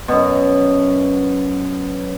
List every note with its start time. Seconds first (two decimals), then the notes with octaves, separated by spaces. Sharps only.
0.08 F#2 B2